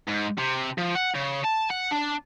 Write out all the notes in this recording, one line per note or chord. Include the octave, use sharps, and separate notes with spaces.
G#2
C3
F3
F#5
C#3
A5
F#5
D4